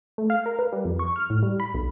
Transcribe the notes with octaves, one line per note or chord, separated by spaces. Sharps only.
A3
F5
A#4
B4
G3
F2
C#6
F6
A2
G3
B5
B1